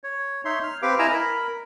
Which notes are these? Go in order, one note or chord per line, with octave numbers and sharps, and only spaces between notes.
C#5
D#4 C#5 E5 C6
F6
C4 G4 B4 F5 D6
E4 D#5 G#5 A#5 E6 F6
A#4 B5